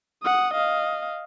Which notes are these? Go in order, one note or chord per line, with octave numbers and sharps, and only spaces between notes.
F#5 D#6
D#5 F5